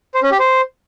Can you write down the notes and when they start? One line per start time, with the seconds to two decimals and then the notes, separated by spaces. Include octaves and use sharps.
0.15 C5
0.23 C#4
0.31 G4
0.40 C5